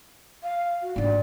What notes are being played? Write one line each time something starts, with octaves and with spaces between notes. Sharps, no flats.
F5
F#4
G#2 D4 D5